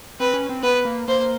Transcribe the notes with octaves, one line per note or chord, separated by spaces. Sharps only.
C4 B4
C#4
C4
B3 B4
A#3
A#3 C5